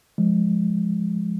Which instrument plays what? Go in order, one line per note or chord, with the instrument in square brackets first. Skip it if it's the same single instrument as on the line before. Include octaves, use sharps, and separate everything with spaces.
[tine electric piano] F3 G#3